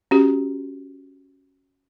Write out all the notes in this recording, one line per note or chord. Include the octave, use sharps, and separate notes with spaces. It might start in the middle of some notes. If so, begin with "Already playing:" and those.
C#4 F#4 G4